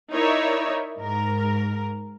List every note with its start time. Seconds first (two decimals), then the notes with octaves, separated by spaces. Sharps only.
0.12 D#4 E4 A#4 C#5 D5 E5
0.99 G#2 A#4